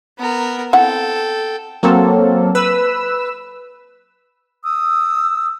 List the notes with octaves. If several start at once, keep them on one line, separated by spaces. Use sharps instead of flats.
B3 A#4
C4 E4 A4 F#5 G5
F#3 A#3 C4 A4
B4 E6
D#6 E6